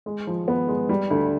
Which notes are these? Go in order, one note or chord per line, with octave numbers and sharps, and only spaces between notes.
G#3
F3
B3
G#3
G3
D2